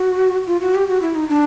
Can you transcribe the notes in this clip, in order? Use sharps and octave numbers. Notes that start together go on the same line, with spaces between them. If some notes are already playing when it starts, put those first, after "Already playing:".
Already playing: F#4
F4
F#4
G4
F#4
E4
D#4
D4